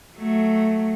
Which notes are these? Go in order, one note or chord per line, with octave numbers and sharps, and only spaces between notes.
F#3 A3